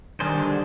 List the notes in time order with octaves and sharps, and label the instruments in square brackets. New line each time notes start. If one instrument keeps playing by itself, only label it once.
[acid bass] D#3 [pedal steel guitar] G3 D4 G#4 C5
[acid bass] D3